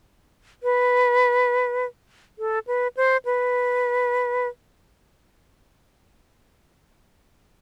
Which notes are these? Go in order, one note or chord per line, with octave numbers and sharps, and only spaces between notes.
B4
A4
B4
C5
B4